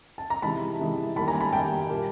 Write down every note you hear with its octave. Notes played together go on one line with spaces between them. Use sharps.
A5
A#5
C3 E3 G#3 A5 B5
C3 E3 G#3
D#3 G3 A#3 A5 B5
G#5 A#5
A5 B5
D#3 G3 A#3 G5 A5
A#2 G3 A#3